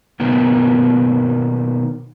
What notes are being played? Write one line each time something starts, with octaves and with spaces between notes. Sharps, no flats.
B2 D#3 A#3 B3